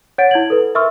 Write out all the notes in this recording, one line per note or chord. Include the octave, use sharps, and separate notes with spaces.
C#5 F#5 A6 D7
E4 G#6 F#7
A4 B4
A#4 E5 C6 C#6 E6 F6